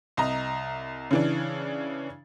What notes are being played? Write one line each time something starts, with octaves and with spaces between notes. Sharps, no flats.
C2 D#5 A#5
C#3 E3 D4